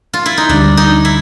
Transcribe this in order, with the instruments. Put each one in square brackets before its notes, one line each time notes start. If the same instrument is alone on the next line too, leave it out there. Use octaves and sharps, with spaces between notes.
[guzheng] F4
E4
D#4
[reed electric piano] D2 D3 G3 [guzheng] D4
[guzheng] D#4
E4